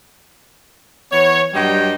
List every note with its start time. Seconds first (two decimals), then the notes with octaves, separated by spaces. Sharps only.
1.11 E3 B3 C#5
1.54 G2 F#3 G3 D#5 G5